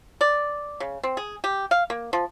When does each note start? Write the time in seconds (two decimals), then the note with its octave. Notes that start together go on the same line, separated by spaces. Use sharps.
0.21 D5
0.80 C#3
1.03 C4
1.17 G#4
1.44 G4
1.71 F5
1.90 A#3
2.13 F3